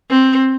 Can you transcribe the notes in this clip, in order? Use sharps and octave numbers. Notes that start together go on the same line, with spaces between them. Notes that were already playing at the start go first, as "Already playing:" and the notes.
C4